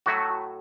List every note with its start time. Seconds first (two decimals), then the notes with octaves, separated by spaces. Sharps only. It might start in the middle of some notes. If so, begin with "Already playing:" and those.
0.06 A2 F#3 A3 F#4